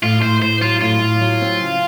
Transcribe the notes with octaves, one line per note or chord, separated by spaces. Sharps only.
A2 F4
A2 C5
A2 C5
F#3 F4
A2 F4
A2
F#3
C4
C#3